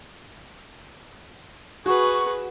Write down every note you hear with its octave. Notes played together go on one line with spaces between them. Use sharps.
F#4 G#4 B4 C#6